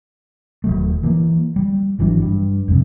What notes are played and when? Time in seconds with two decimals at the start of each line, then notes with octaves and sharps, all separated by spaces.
0.64 D#1 D2 F#3 A3
1.03 E3 A#3
1.56 G3
1.99 G#1 E3 F#3 D4
2.19 G2 G3
2.68 F2 G#2 C3